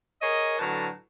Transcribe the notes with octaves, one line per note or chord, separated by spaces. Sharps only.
G#4 A#4 C#5 D#5
A2 D3 F#3 B4 A5 A#5